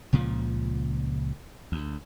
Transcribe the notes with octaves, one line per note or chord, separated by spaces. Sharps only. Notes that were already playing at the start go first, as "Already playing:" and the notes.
C#2 A#2 C#3 F3
D2